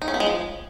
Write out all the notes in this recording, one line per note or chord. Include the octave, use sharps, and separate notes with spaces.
D#4
C#4
B3
G#3
F3